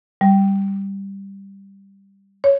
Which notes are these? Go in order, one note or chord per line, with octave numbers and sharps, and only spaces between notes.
G3
C#5